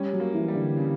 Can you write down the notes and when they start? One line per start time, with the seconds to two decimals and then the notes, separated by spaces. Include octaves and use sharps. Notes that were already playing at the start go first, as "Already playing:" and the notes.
Already playing: G3 C#4
0.13 F#3
0.20 A#3
0.34 E3
0.48 G3
0.55 D3
0.77 C#3